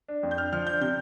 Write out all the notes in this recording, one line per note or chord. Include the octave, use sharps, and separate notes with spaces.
D4
F2
G6
D4 F6
F3 F6
D4 G6
C3 G6